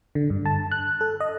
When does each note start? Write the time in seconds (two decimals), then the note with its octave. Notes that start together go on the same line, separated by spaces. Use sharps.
0.15 D3
0.30 G2
0.46 A5
0.71 F#6
1.01 A4
1.20 D#5